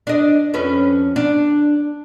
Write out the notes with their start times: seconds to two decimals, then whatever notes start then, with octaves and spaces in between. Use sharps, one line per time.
0.07 D4 D#5
0.54 F2 C#4 B4
1.16 D4